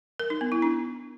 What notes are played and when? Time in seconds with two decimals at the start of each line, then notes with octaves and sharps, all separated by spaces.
0.20 A#4
0.30 D#4
0.41 B3
0.52 E4
0.62 D4